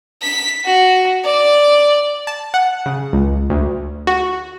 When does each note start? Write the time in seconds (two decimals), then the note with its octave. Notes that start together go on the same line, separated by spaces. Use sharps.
0.22 B6
0.65 F#4
1.24 D5
2.27 A5
2.54 F#5
2.86 C#3
3.13 C#2
3.50 D2
4.07 F#4